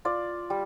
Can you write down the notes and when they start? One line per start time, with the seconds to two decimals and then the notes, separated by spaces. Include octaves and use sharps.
0.05 F4 D5
0.50 G3